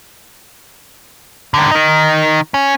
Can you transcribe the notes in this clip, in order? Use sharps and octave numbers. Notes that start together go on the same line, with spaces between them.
D3 D#3
D#3 D#4
C#4